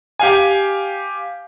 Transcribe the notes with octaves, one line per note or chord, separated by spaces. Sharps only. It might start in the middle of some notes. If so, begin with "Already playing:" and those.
G4 F5 G#5